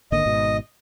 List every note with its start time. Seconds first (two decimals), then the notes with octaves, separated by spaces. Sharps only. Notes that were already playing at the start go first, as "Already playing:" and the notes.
0.12 G#1 D3 A#3 D#5
0.26 G#1 G#2 B2